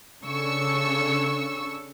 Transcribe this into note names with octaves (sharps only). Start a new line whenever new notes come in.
C#3 D4 A4 C#6 E6